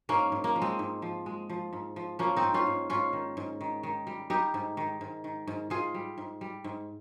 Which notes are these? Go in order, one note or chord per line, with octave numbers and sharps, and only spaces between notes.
G#2 A#3 C#4
G#2
A#3
F3
G#3 C4
G#2
F3
G#3
F3
G#2
F3
F3 A#3 C#4
C4 D#4
G#2
C#4 F4
G#2
G#2 C#4 F4
D#3
G#2
D#3
D#3
G3
G3 D#4 G4
G#2
D#3
G#2
D#3
G#2
G#2 F4 G#4
G3
G#2
G3
G#2